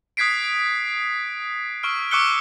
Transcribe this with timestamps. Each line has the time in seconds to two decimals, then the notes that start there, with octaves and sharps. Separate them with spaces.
0.17 D#6 F#6 G#6 B6 C7 D7
1.83 C#6 E6 F6 D7
2.11 C#6 D6 E6 F#6 C#7 G7